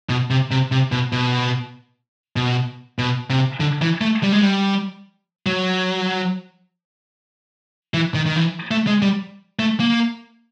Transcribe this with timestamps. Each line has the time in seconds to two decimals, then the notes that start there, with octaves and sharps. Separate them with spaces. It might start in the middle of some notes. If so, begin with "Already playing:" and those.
0.09 B2
0.30 C3
0.51 C3
0.72 C3
0.92 B2
1.12 B2
2.36 B2
2.98 B2
3.30 C3
3.60 D3
3.82 E3
4.01 A3
4.23 G3
4.32 G#3
4.42 G3
5.46 F#3
7.94 E3
8.15 D#3
8.26 D#3
8.36 E3
8.71 A3
8.87 G#3
9.02 G3
9.59 A3
9.80 A#3